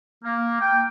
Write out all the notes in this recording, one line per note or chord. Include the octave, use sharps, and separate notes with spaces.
A#3
G5